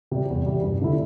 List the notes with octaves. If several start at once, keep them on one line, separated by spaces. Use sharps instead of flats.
C3 G3
E2
C3 G3
G2
D3 A3 E4